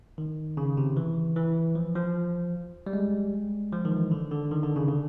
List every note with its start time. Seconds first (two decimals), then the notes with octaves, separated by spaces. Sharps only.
0.18 D#3
0.57 C#3
0.77 C3
0.97 E3
1.36 E3
1.75 F3
1.96 F3
2.87 G3
2.93 G#3
3.73 F3
3.85 D#3
3.92 E3
4.11 D3
4.31 D3
4.51 D#3
4.63 D3
4.76 C#3
4.88 D3